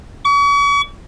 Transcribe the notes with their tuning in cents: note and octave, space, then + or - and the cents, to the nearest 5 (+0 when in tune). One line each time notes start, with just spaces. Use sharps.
C#6 +40